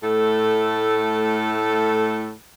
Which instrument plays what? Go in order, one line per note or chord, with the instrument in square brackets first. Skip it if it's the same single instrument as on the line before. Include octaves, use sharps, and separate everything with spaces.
[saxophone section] A2 A3 A4